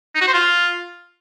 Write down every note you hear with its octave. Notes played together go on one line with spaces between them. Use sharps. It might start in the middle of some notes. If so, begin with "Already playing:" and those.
D#4
F#4
C5
F4